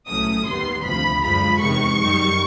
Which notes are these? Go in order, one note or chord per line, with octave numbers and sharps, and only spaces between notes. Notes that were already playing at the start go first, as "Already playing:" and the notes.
B1 A2 F#3 A3 C#4 D#6
D#2 D#3 G3 B3 C6
D2 C3 F3 B5
F#2 D3 F3 G#3 B5
E2 C3 D#3 G#3 C#6
F#2 D#3 G3